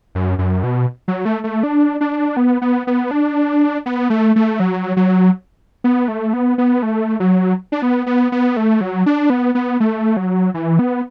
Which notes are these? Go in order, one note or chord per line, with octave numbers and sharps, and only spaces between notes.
F#2
F#2
B2
F#3
A3
A3
D4
D4
B3
B3
B3
D4
B3
A3
A3
F#3
F#3
B3
A3
B3
B3
A3
F#3
D4
B3
B3
B3
A3
F#3
D4
B3
B3
A3
F#3
E3
B3